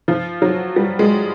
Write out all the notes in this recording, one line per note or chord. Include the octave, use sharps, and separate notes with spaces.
F3
F#3
G3
G#3